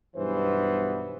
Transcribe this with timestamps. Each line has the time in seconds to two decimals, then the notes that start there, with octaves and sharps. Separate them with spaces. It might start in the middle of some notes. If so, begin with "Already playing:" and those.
0.16 B1 G2 E3 B3 B4 C5